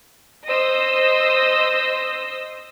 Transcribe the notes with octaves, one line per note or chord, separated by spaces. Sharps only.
C5 D#5 D#6 E6